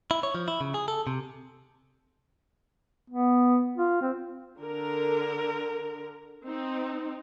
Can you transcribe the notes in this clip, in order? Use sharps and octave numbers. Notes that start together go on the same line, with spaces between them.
E4
C#5
F3
E4
C#3
G#4
A4
C3
B3
F4
C4
D3 A#4
C4 D#4